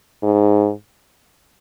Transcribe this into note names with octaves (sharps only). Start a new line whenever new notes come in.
G#2